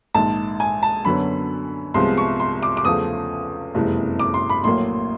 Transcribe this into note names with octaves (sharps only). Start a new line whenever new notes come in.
A#1 G#2 D#3 A5
G#5
A5
F#2 D3 F#3 B3 B5
C2 C3 F3 G#3 B3 C6
C#6
C6
D6
D6
E2 C#3 F3 A3 D#6
F#1 F2 C3 E3 G#3
D6
C6
B5
A#1 A2 F#3 A#3 C6